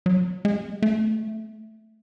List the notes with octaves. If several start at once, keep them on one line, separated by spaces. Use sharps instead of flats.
F#3
G#3
A3